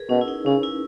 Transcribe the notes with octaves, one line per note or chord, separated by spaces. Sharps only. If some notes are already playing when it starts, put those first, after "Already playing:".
Already playing: G#4 A#4 B4
B2 C#4
E4
D#4
C#3 C#4
E4